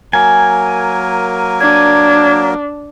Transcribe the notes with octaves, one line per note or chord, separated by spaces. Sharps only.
F#3 A#3 A#4 G#5
D4 G#6